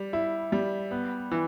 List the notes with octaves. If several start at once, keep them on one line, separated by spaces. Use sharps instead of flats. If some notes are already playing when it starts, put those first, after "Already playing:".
Already playing: G3
E4
G3
B3
E3